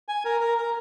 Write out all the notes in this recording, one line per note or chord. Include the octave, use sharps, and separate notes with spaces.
G#5
A#4
A#4
A#4